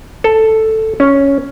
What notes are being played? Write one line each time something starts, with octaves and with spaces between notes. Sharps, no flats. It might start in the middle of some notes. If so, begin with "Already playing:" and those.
A4
C#4